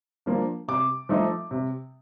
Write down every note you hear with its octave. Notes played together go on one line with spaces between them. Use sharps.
F3 A#3 D4
C3 D6
F3 A3 D#4
C3